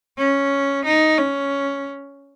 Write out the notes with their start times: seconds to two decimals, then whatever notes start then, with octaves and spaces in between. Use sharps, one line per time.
0.18 C#4
0.85 D#4
1.18 C#4